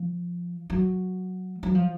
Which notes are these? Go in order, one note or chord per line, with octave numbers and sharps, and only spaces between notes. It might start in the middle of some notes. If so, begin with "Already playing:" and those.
Already playing: F3
F#3
F#3
F3